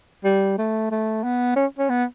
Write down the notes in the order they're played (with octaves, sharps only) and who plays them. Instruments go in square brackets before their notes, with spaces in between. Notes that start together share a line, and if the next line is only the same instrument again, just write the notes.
[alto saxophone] G3
A3
A3
B3
C#4
C#4
B3